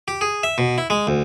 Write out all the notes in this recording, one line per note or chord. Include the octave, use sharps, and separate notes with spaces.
G4
G#4
E5
B2
E4
G#3
D2